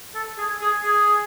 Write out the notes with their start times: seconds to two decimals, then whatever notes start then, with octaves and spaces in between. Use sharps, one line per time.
0.15 A4
0.38 G#4
0.61 G#4
0.84 G#4